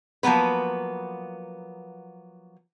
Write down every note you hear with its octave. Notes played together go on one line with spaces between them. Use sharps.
F3 F#3 A#3 B3 B4